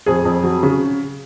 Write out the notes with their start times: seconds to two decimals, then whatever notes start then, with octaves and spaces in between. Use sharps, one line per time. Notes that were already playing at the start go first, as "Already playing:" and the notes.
0.06 F2 G#4
0.25 F2
0.43 F#3
0.63 C#3